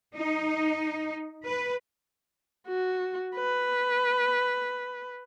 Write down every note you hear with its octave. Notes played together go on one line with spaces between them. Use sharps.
D#4
B4
F#4
B4